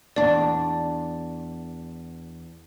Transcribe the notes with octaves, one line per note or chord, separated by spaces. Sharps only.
E2 D4 D5